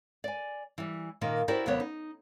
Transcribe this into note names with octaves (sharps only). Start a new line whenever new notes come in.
D5 G#5
E3 G3
A#2 D#3 A#3
E4 F#4 G4 A#4 C5 D5
D#2 C3 F#3 B3 C#5
D#4